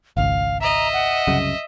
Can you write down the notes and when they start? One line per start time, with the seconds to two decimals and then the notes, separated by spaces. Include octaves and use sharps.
0.17 G#1 C#2 F5
0.61 D#5 E5 A#5
0.93 F#5
1.27 C2 F#2 C#3